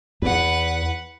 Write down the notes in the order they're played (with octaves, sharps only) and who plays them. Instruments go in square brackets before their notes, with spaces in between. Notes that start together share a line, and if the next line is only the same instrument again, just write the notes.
[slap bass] E2 [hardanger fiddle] B4 F#5